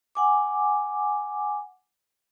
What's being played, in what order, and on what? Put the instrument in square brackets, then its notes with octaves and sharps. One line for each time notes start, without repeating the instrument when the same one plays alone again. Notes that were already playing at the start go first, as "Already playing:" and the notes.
[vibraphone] F#5 G#5 D6